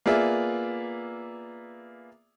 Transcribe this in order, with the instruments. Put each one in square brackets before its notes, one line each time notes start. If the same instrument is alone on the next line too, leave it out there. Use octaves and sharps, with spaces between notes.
[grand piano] A#3 B3 F4 G#4 D5 E5